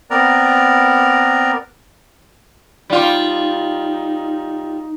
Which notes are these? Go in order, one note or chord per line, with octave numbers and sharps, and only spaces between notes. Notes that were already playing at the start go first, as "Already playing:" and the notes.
B3 C4 A#4 D5 A#5
G3 D#4 F4